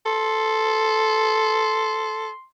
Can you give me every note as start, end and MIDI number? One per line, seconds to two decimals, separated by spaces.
0.06 2.30 69
0.06 2.45 84